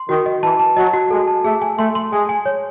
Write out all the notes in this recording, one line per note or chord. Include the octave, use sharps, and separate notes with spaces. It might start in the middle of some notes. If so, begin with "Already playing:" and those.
Already playing: C6
D#3 F#4
D#5
E3 A5
A5
F#3 D#5
F#4
G#3 A4
A5
A3 G#4
G#5
A3 C6
C6
G#3 G#5
G#5
C#5